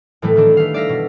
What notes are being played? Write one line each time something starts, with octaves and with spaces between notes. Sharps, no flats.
A2 E3 G3 A3
D#3 E3 D4
A3 F5
D5 E5 F5 A#6
B2